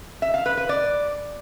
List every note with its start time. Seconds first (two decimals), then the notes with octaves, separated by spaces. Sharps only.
0.22 E5
0.34 F5
0.46 B4
0.57 B4
0.69 D5